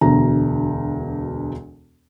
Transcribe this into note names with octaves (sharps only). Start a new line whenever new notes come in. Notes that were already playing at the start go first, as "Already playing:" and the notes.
E1 D2 B2 A#5